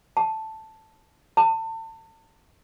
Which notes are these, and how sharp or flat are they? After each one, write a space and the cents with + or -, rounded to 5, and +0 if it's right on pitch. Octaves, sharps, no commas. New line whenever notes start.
A5 +0
A5 +35